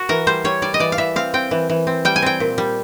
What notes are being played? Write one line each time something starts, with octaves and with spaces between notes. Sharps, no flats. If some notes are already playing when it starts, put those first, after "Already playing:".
Already playing: F#4
E3 A#4
G3 C5
G3 C#5
G3 D5
D#5
E3 D5
F5
E3 E5
C4 F5
C4 G5
E3
E3
C4
G3 G5
G#5
C4 G5
A#2
G3